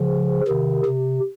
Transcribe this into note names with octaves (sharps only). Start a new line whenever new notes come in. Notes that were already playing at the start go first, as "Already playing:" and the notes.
Already playing: C#3 F3
C3 D#3
C3